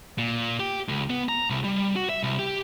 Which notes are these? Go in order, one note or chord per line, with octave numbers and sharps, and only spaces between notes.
A#2
G4
C#2
B3
A#5
C2
G3
F#4
E5
C2
G4